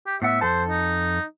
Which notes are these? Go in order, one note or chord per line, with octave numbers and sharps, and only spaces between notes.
G4
A2 B3 E5 F#5
F2 A4 C5 A5
D#4